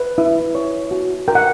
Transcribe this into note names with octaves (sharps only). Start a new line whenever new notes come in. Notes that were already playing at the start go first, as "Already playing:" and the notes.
Already playing: B4
E4
C#5
F#4
A#4 G5
F#5